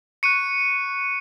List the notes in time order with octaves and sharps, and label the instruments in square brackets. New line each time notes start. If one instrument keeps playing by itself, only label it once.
[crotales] C#6 F#6 C#7 D#7